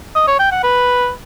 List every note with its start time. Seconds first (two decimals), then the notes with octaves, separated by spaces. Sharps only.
0.15 D#5
0.27 C#5
0.39 G5
0.51 F#5
0.63 B4